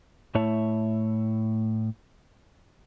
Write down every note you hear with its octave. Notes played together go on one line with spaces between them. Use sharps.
A2 A3 E4 C#5 E5 A5